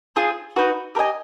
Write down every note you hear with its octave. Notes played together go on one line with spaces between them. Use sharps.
C4 F4 G#4
D#4 F#4 B4
G4 A#4 D#5 G#5